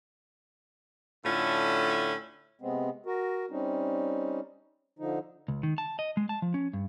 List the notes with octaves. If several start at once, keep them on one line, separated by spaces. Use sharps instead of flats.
A2 D3 C#4 F4 E5
C3 G#3 B3 C4
F#4 A#4
G3 C4 C#4 D#4
D3 F3 D#4
C#2
D#3
A5
D#5
G#3
A5
F3
C#4
G2